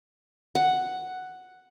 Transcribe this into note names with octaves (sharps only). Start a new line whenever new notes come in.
F#5